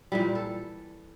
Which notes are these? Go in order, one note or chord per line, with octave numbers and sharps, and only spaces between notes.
A#2 E3 G3
A4